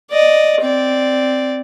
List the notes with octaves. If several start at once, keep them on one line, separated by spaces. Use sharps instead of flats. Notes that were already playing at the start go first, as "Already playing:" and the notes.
D5 D#5
C4 D5